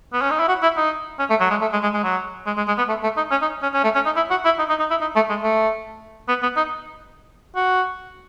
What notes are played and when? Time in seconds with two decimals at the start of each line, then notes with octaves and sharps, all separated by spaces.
0.13 B3
0.22 C#4
0.31 D#4
0.40 E4
0.48 F#4
0.62 E4
0.77 D#4
1.19 C#4
1.30 A3
1.41 F#3
1.51 G#3
1.61 A3
1.73 G#3
1.83 G#3
1.94 G#3
2.03 F#3
2.46 G#3
2.57 G#3
2.68 G#3
2.78 B3
2.89 A3
3.03 A3
3.17 D#4
3.31 C#4
3.42 D#4
3.63 C#4
3.74 C#4
3.84 A3
3.95 C#4
4.05 D#4
4.16 E4
4.30 F#4
4.45 E4
4.59 D#4
4.69 D#4
4.80 D#4
4.90 E4
5.01 D#4
5.16 A3
5.29 G#3
5.43 A3
6.28 B3
6.42 B3
6.57 D#4
7.56 F#4